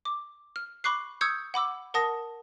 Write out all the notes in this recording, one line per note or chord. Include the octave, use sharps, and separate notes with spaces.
D6
F6
B5 C#6 D6 F#6 C7
C#6 D#6 E6 G6 G#6 C#7
F#5 B5 D6 E6
A#4 F#5 A5 D#6 A#6